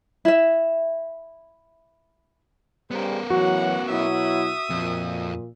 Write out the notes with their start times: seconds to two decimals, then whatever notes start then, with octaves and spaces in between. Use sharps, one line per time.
0.25 E4 E5
2.91 C#3 G3 B3 G#4 A#4 C5
3.30 E3 F#3 F#4 F#5
3.90 B2 F#3 E4 E5 D#6
4.70 F2 A#2